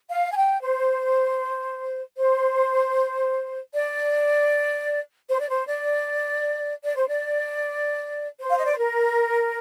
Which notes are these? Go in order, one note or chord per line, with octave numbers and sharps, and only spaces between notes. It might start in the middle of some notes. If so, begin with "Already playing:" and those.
F5
G#5
G5
C5
C5
D5
C5
D5
C5
D5
D5
C5
D5
C5
F5
D#5
D5
C5
A#4